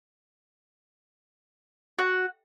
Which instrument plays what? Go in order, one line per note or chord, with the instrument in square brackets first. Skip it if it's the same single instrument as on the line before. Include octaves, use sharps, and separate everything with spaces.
[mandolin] F#4